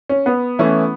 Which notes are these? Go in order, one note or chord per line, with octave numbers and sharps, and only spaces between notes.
C#4
B3
E3 A3 C#4 E4